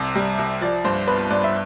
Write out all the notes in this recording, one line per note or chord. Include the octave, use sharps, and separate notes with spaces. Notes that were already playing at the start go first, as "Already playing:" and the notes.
Already playing: C2 C3
G3
C2
F3 D5
G2 C5
B3 B4
G2 D5
E5